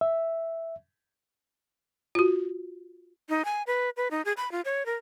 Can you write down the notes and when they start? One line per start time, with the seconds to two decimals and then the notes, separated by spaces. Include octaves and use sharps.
0.01 E5
2.15 F4 F#4
3.29 D#4
3.45 G#5
3.67 B4
3.97 B4
4.11 D#4
4.25 G#4
4.37 B5
4.52 F4
4.65 C#5
4.86 A#4